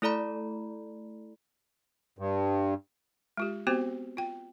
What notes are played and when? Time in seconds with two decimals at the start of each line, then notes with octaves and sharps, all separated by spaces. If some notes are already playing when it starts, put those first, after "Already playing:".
0.02 A3 E4 A4 D5 A#5 B5
2.19 G2
3.37 G#3 F4 G4
3.67 B3 C4 F#4 G4 C5
4.17 F4 G5